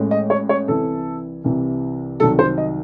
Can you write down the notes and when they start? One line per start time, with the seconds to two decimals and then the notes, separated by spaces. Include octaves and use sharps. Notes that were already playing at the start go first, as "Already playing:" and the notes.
Already playing: A1 A2 G#3
0.11 D#5
0.30 C#5
0.49 C#5
0.68 C2 C3 E3 A4
1.44 C2 C3 E3
2.20 C2 C3 D#3 F#3 A4
2.39 C5
2.58 D#5